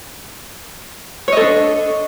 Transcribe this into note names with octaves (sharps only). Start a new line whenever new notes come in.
D4 A4 C#5 D#5